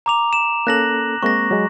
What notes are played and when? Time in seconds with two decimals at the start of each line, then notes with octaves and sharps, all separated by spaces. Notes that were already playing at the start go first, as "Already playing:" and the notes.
0.06 A#5 D6 F7
0.33 E7
0.67 A#3 C#4 A4 F#6 A#6 F#7
1.23 G#3 A#3 C4 C#6 A#6
1.51 F#3 G#3